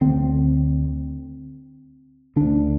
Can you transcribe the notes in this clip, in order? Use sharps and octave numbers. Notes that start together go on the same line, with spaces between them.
D2 D3 C4
D2 D3 D4